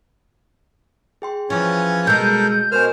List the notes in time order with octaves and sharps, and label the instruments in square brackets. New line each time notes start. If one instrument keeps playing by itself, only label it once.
[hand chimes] G#4 G5 C6
[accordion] E3 C#4 C#5 [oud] F3
[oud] B2 G#3 [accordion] A4 A#4 [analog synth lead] G6
[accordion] B2 C5 F6 [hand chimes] A#4 G#5